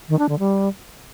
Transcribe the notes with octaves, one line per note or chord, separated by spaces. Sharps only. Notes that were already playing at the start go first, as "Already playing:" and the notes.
D#3
D4
D3
G3